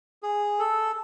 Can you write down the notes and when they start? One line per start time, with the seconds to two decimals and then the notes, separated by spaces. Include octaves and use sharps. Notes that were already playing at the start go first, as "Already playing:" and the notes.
0.23 G#4
0.59 A4